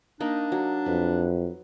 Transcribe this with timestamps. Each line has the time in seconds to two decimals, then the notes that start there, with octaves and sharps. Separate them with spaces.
0.20 A#3 D4 D#4 D#5
0.52 F#3
0.86 F2 B4